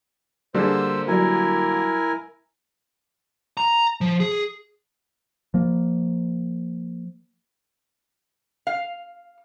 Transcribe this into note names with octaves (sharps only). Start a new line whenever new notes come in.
D3 G3 A#3 D4 G#4 C5 E6
F#3 G3 E4 A#4 G#5
A#5
F3
G#4
F3 A#3
F5